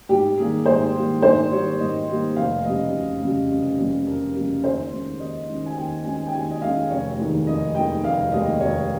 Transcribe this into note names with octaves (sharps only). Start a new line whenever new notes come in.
G#2 G4
D#3 G3 A#3 G#4
G#2 C5
D#3 G3 A#3
G#2 C5
D#3 G3 A#3 C#5
G#2 D#5
D#3 G3 A#3
F1 F5
F2 C#3 G3 D#5
F1
F2 C#3 G3
F1
F2 C#3 G3
F1 A#4
F2 C#3 G3
D#2 C5
D#3 G#3 C#4
D#2 D#5
D#3 G#3 C#4
G#5
D#2 G5
D#3 G#3 C#4 G#5
G5
D#2 G#5
D#5
D#3 G#3 C#4 F5
F1 C#5
D#2 D#3 G#3
F1 D#5
D#2 D#3 G#3 G5
F1 F5
D#2 D#3 G#3 D#5
F1 C#5